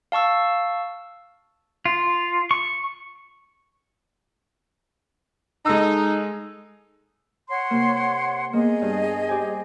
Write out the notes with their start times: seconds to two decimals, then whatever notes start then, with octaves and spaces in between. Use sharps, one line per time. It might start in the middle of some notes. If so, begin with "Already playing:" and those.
0.12 F5 A5 C#6 E6
1.85 F4
2.51 C#6
5.66 G#3 D#4 A4 E6
7.50 C#5 F#5 C6
7.71 C3 A#3
8.53 A#3 B3 G#4 D#5
8.82 G2
9.29 G4 C5 G#5